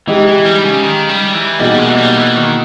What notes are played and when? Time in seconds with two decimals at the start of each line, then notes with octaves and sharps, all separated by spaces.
0.07 E3 G#3 D#4 G4
0.27 E3
0.45 G3
0.65 C#3
0.83 D#3
1.09 G3
1.34 E3
1.59 B2 G3 A#3 D#4 G#4 D#5
1.78 G#3
1.89 E3
1.97 G3
2.17 E3
2.36 D#3